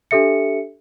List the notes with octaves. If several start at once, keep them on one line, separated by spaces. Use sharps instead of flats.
D4 G4 A4 E5 C#7